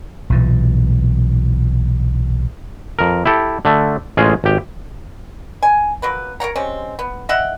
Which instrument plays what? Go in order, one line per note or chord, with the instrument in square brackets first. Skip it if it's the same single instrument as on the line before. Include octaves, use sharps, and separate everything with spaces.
[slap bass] B1 A#2 E3
[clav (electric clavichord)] F2 A#4
E4 G4 A4
D3 A3
A1 G#3 C#4 F4 G#4
G#1 G4
[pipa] G#5
F#3 A#3 B4
A#4 C#5 F#5 A#5
G3 G#3 C4 C#4
B3
D#5 E5 F#5 G5